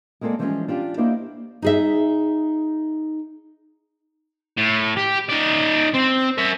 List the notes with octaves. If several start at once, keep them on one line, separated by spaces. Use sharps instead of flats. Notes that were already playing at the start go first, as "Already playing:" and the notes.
G#3 A#3 C4 G#4 A4 D5
E3 F3 G3 G#3 A#3 C#4
D4 F4 G4
A#3 D4 E4 G4 C5 D#5
D#4 G#4 E5
A2
G4
D#4 D5
C4
A#4 E5